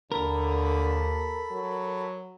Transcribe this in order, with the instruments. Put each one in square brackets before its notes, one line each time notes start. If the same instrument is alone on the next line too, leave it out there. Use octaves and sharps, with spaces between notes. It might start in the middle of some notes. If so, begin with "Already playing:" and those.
[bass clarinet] D#2 [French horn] D3 [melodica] A4 B5 [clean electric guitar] A#4
[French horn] F#3